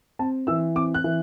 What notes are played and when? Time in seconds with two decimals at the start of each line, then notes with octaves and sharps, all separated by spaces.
0.19 C4 A5
0.47 E3 E6
0.75 C4 D6
0.94 F#6
1.04 E3